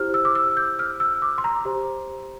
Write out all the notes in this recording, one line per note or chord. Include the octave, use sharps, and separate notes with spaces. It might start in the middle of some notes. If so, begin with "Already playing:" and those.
Already playing: E4 G4 C5 F6
E6
D6
E6
G6
F6
E6
D6
C6
A#5
G4 C5